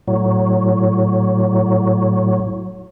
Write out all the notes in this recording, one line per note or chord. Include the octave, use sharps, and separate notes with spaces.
A2 F#3